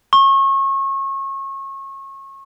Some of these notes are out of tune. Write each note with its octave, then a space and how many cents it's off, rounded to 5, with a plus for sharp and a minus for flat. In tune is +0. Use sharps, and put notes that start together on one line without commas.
C#6 -30